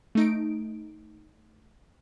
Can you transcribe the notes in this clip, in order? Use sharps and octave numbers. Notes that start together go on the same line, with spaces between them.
A3 D#4 D7